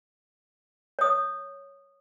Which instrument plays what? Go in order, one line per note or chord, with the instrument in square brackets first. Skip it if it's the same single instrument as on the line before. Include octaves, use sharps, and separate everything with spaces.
[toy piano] C#5 D#6